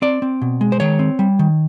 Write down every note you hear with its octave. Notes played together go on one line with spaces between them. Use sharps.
C4 D5
C4
B2
G#3
C5
D#3 C#5
C4
G3
D#3